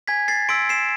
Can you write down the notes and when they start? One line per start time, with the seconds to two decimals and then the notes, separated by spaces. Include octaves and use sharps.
0.08 G#5 G#6 B6
0.28 A6 C7
0.49 C6 E6 B6 D7
0.69 C7 E7